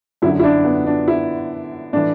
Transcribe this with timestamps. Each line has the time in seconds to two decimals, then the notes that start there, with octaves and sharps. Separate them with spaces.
0.22 F#2 D3 F#3 E4
0.40 E4
0.44 D4
0.65 B3
0.87 D4
1.08 E4
1.93 A2 E3 D4